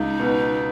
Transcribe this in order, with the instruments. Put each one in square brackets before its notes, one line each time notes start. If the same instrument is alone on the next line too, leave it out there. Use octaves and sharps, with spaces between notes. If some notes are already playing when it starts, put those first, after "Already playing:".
Already playing: [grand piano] C#2 [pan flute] D#4
[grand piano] B2 B3